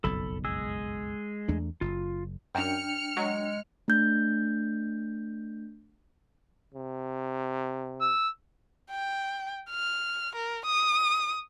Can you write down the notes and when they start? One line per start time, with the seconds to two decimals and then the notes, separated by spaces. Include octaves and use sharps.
0.04 F#1 B1 F2 A4 B5
0.45 G#3 G#4 E6
1.48 E2 A3 D4
1.81 F#1 F4
2.55 F#2 D4 G5 F6 C#7
3.17 F#3 G#3
3.88 A3 D4 G6
6.74 C3
8.01 E6
8.91 G5
9.70 F6
10.35 A#4
10.66 D#6